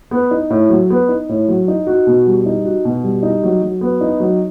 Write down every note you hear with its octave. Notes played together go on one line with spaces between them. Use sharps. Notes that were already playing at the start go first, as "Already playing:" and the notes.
B3
D#4
A2
F#3
B3
D#4
A2
F#3
D#4
F#4
B2
G3
D#4
F#4
B2
G3
D#4
F#3
F#3
B3
D#4
F#3